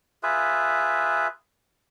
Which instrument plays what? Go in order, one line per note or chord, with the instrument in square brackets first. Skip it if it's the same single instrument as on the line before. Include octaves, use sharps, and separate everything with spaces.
[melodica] F4 G#4 B4 E5